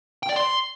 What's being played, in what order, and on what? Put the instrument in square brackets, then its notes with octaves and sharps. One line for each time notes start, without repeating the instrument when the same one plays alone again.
[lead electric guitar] G5
D5
C6